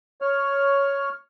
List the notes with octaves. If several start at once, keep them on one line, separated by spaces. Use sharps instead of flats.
C#5 F6